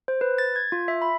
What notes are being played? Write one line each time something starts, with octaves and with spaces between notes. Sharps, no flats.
C5
B4
A6
G#6
F4
E5
B5